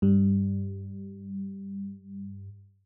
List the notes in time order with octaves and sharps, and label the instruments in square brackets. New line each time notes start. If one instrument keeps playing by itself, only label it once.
[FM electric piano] G2 G3